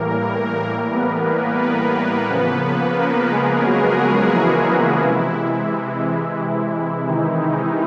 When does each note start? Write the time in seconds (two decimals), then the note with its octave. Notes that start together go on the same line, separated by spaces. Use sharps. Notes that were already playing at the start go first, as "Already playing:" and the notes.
Already playing: A2 E3 G3 A#3 A#4
0.91 B3 B4
1.26 A#3 A#4
1.60 B3 B4
2.29 C#3 F3 A#3 B3 B4
2.97 A#3 A#4
3.31 G#3 G#4
3.65 F#3 F#4
4.34 E3 E4
5.02 C3 E3 G#3
7.07 D#3 D#4